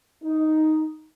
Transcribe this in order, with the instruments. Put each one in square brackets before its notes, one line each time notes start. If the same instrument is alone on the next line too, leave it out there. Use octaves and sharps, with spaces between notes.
[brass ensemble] D#4